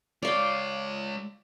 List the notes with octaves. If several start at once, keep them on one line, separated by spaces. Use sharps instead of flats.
G#3 C#5 D5 F5 G5